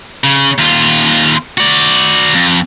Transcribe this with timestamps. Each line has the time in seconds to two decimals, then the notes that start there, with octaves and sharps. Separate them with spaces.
0.24 C#3
0.58 D#2 F4
1.58 F#4 D5
2.34 F2